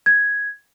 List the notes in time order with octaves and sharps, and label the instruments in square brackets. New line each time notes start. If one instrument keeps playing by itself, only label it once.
[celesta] G#6